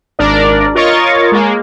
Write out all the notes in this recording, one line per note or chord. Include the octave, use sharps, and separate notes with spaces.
G#1 D4 A#4 D5
F4 A#4 C#5 D#5 C#6 A6
G#3 A#3